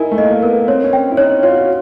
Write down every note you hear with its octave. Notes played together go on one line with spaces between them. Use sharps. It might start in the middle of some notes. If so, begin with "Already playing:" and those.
Already playing: D#4 E4 A#4 G#5
A3
A#3 D#5
A#3
B3 A#4
C4 C#5
C#4
G5
E4
D#4 C#5
F4 C#5
F#4
F4